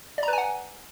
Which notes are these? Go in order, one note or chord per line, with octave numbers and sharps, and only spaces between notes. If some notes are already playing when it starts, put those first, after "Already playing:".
B4 D5 F#5 G#5 A#5